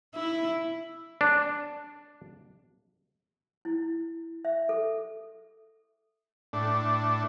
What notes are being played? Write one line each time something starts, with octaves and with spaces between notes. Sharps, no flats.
E4
D4
E4
E5
A4
A2 D4